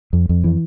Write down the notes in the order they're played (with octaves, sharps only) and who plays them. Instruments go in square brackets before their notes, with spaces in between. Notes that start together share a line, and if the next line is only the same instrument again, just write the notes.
[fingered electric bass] F2
F2
E3